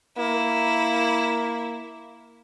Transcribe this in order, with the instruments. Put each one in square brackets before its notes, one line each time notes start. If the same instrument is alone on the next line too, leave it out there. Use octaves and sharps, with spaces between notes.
[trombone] A#3 [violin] E4